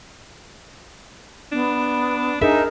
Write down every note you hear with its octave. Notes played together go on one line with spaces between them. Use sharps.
B3 D4
D4 D#4 G#4 A#4 E5